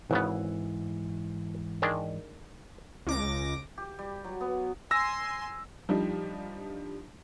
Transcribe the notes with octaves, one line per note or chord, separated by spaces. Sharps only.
G#1 G#2 C#3 E3 B3
D#3 G#3 D4
C#2 D6 A#6
G4
G3
F#3
B3
G#5 C6 E6 A#6
F3 G3 D4 D#4